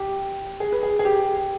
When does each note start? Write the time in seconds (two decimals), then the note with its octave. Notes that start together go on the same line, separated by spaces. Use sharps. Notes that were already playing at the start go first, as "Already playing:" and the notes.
Already playing: G4
0.60 G#4
0.72 B4
0.83 G#4
0.99 G#4
1.05 G4